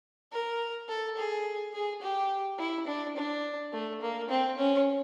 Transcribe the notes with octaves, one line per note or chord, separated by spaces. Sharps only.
A#4
A4
G#4
G#4
G4
E4
D4
D4
A3
A#3
C4
C#4